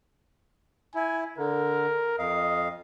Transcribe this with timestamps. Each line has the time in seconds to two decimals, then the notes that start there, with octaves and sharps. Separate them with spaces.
0.95 E4 G#5
1.38 D3 A#4
2.19 F2 D#5 F5